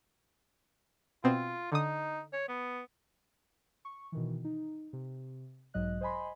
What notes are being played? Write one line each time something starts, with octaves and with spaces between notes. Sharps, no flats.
B2 B3 C4 F4
D3 D#4 D#6
C#5
B3
C#6
B2 D#3 E3
D#4
C3
B1 G#2 F#3 D#5 F#6
C5 D#5 G#5 B5 C6